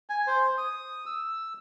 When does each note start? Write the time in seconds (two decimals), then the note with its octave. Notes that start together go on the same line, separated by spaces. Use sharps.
0.10 G#5
0.27 C5
0.58 D#6
1.06 E6